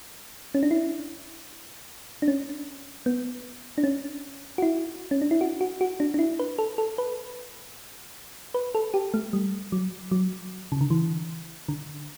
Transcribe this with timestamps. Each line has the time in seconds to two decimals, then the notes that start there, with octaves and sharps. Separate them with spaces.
0.54 C#4
0.63 D4
0.71 E4
2.22 D4
2.28 C#4
3.06 B3
3.78 D4
3.83 C#4
4.58 F#4
4.62 E4
5.11 C#4
5.22 D4
5.31 E4
5.41 F#4
5.61 F#4
5.81 F#4
6.00 D4
6.14 D4
6.19 E4
6.39 B4
6.58 A4
6.78 A4
6.98 B4
8.54 B4
8.75 A4
8.94 G4
9.14 A3
9.33 G3
9.72 F#3
10.11 F#3
10.72 C#3
10.81 D3
10.90 E3
11.69 D3